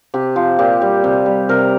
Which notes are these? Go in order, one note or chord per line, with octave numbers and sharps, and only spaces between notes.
C3 G4
F3
A#2 G4
G3
C3
G3
C3 A#4